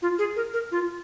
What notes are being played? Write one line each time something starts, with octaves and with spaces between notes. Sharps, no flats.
F4
G#4
A#4
A#4
F4